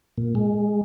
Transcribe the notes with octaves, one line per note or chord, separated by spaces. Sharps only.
A#2
G#3